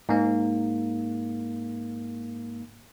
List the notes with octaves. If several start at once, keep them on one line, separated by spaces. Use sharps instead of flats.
G#2 A#3